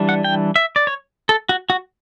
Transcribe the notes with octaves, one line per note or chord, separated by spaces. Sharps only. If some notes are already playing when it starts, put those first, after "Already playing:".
Already playing: E3 G3 D4
F#5
G5
E5
D5
C#5
A4
F#4
F#4